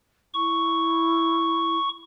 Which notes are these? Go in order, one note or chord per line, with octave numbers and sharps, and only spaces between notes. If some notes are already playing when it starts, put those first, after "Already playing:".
E4 C#6